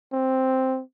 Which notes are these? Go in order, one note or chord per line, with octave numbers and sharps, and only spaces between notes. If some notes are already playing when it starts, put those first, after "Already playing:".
C4